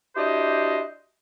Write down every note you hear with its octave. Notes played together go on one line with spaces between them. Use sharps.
D4 E4 F#4 G4 C5 D#5